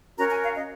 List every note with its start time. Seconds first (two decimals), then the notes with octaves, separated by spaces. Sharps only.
0.18 C#4 F#4 A#4 A#5
0.31 G#5
0.44 F5
0.55 D#5